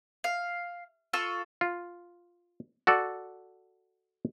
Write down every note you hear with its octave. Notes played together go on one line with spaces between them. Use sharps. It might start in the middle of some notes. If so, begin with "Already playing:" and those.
F5
F4 A4 C#6 E6
F4
F#4 A4 D5